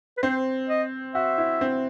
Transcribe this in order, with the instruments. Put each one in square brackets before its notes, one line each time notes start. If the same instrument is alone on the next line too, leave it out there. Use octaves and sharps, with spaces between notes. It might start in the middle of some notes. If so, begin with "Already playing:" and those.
[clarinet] B4
[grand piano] C4 [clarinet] C5
[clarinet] D#5
[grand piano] F#4 [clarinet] E5
[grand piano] E4
C4